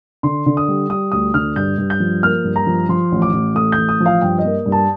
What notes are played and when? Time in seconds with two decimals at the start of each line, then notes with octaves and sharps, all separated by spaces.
0.23 D3 C6
0.46 D3
0.57 D#6
0.68 G3
0.90 G3 D#6
1.12 D2 D#6
1.34 D3 F6
1.56 G2 G6
1.78 G2
1.90 G6
2.00 F3
2.23 A#3 F6
2.44 G2
2.56 A#5
2.67 F3
2.89 F3 C6
3.12 A1
3.22 D6
3.33 A1
3.55 A3 D#6
3.72 A1 G6
3.89 D#6
4.00 F3
4.06 F5
4.22 G2 G5
4.39 D#5
4.45 A#3
4.66 G2
4.72 A5